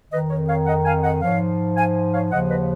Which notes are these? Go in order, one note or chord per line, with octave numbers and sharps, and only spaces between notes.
F2 D#3 B4 D#5
A#4 C#5
C#5 F5
D#5 F#5
F5 G#5
D#5 F#5
G#2 F3 C#5 F5
F5 G#5
C#5 F5
D#2 C#3 F3 D#5 F#5
B4 D#5